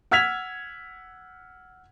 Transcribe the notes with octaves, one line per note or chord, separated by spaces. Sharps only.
F#5 E6 F6 G#6 B6 F7